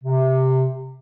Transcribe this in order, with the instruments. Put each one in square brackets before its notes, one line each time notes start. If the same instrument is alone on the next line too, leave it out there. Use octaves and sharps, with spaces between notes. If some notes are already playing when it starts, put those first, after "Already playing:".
[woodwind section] C3